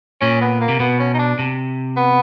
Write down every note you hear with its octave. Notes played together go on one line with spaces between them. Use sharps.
A#2 C#4
B3
A#3
C3
B2 B3
C#4
D#4
D4
C3
B3